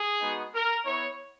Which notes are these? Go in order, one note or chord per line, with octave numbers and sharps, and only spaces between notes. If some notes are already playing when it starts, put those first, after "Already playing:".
Already playing: G#4
G#3 B3 D#4 F#4
A#4
B3 E4 C#5